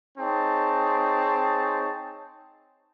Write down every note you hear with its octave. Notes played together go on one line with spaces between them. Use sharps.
C4 D#4 G#4 C#5 A5